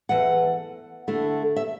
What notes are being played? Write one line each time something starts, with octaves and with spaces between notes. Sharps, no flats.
E2 E3 A3 F#5
D3 A3 E4
E5